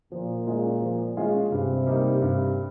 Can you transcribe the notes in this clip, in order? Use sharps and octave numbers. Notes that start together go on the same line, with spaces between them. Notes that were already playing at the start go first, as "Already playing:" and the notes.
A#2 F3
G#3 C#4 F4 G#4
F3
G#3 C#4 F4 G#4
G2 C3
G3 A#3 D#4
G2